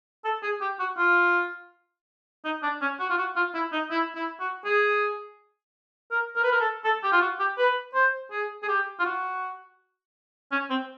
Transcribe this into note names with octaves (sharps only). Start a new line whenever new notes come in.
A4
G#4
G4
F#4
F4
D#4
D4
C#4
F#4
F4
F#4
F4
E4
D#4
E4
E4
F#4
G#4
A#4
A#4
B4
A#4
A4
A4
G4
F4
F#4
G4
B4
C5
G#4
G#4
G4
F4
F#4
C#4
C4